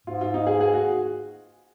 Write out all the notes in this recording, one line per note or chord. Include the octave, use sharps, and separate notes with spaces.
G#2 F4
F4
D#4
G#4
G#4
F#4